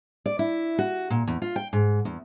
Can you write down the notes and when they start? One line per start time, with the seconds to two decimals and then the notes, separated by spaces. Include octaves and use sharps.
0.26 D5
0.39 E4
0.79 F#4
1.10 A#2
1.28 E2
1.42 F4
1.56 G5
1.73 G#2
2.05 E2